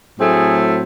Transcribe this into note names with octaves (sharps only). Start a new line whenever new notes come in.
A2 F#3 A3 C4 G#4